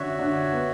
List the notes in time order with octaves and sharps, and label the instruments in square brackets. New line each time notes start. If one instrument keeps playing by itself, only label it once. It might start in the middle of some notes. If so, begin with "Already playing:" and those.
Already playing: [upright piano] D3 C#4 D4 [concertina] F#4 C#5 E5
[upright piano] D3 D4
B3